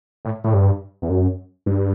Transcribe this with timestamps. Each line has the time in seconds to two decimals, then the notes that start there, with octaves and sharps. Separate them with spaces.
0.25 A2
0.44 A2
0.54 G2
1.02 E2
1.10 F#2
1.66 G2